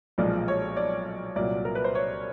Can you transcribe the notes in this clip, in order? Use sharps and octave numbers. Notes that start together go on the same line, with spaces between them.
B1 A#2 F3 G#3 D5
C#5
D5
C2 A#2 F#3 D5
A#4
B4
C5
C#5